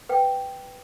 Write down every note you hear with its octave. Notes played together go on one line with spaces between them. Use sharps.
B4 G5